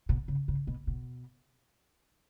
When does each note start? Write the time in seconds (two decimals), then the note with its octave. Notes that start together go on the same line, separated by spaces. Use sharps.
0.09 B2
0.28 C#3
0.48 C#3
0.67 B2
0.87 B2